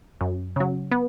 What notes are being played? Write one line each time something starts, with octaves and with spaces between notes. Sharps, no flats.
F#2
C#3 F#3
B3